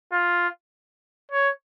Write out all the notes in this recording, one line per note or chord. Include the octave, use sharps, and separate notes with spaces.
F4
C#5